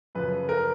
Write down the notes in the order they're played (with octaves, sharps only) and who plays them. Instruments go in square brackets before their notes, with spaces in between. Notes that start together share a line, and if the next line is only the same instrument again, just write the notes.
[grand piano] F#2 C#3 F3 B4
A#4